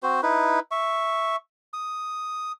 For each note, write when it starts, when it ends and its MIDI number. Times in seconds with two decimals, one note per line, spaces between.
0.03 0.21 60
0.03 0.21 66
0.03 0.21 72
0.23 0.59 63
0.23 0.59 64
0.23 0.59 71
0.71 1.36 76
0.71 1.36 85
1.73 2.52 87